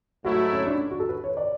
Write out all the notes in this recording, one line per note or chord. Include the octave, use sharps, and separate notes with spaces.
G#2 F#3 A3 E4 F#4
C#4
D4
F#4
A4
B4
C#5
D5